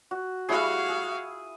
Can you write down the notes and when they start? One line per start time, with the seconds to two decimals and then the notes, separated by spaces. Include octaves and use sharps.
0.11 F#4
0.49 G3 E4 F#4 G#4 F5
0.89 G#4